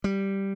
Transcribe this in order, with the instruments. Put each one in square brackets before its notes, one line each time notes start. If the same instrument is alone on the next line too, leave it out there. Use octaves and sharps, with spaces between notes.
[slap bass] G3